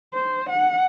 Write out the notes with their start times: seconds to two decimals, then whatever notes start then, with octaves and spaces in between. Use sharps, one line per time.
0.14 C5
0.49 F#5